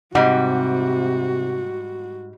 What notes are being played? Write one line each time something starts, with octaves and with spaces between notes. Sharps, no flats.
G#2 C3 G3 F#4 F#5